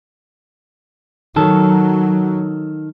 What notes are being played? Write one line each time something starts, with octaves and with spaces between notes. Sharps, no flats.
D#3 F#3 A4